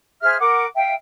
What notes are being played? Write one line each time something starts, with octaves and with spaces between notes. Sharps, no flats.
G#4 C5 E5 F6
A#4 F#5 D6
E5 F5 G5